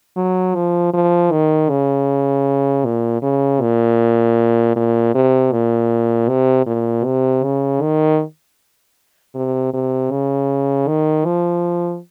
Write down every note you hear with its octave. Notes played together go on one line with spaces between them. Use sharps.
F#3
F3
F3
D#3
C#3
A#2
C#3
A#2
A#2
C3
A#2
C3
A#2
C3
C#3
D#3
C3
C3
C#3
D#3
F3